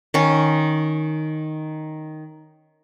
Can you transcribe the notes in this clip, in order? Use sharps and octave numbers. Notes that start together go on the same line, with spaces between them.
D#3 C#4